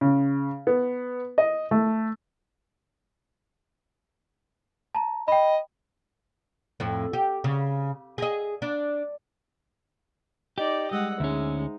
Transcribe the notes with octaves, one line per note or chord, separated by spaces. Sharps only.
C#3
B3
D#5
A3
A5 A#5
D#5 G5 B5
F2 A2
G4
C#3
G#4 D#5
D4
D#4 G4 D5 D#5
G3 G#3 D#5 F#5 E6
D2 G#3 C#4 D#4 C5 E5